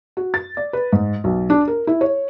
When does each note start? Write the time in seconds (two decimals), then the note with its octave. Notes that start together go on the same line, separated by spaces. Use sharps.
0.17 F#4
0.34 A6
0.57 D5
0.73 B4
0.93 G#2
1.24 B1
1.50 D4
1.68 A#4
1.87 E4
2.01 C#5